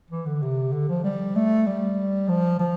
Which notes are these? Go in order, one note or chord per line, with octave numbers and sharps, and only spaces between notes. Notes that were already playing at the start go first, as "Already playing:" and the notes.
E3
D3
C3
D3
F3
G3
A3
G3
F3
F3